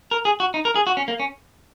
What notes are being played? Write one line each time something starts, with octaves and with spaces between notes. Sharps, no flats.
A#4
G#4
F#4
D#4
A#4
G#4
F#4
C#4
A#3
C#4